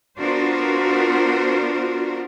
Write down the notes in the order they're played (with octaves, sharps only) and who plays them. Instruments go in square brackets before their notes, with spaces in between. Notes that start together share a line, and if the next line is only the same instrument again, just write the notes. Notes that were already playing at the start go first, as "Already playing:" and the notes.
[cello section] B3 D4 F4 F#4 A#4 C5